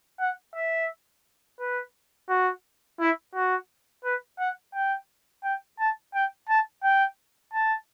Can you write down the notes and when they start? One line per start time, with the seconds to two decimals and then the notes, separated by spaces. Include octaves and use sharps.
0.20 F#5
0.55 E5
1.60 B4
2.29 F#4
3.00 E4
3.34 F#4
4.04 B4
4.39 F#5
4.74 G5
5.44 G5
5.79 A5
6.14 G5
6.49 A5
6.84 G5
7.54 A5